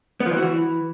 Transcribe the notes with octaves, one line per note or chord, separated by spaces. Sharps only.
B3
F3
E3
F#4
E3